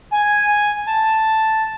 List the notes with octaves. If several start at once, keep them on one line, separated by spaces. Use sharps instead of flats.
G#5
A5